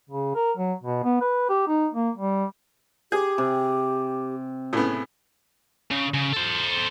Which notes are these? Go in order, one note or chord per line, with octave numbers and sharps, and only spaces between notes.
C#3
A#4
F#3
B2
B3
B4
G4
D#4
A#3
G3
G4 G#4
C3
A2 C#3 B3
C#3
C#3
A4 C5